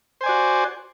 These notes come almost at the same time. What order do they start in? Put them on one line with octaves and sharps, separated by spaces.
C5 G#5 D5 F#4